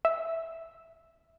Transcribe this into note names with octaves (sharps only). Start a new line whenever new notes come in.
E5